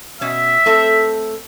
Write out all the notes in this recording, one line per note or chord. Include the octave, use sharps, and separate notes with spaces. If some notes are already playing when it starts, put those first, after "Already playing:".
B2 C#4 E5
A3 C4 A4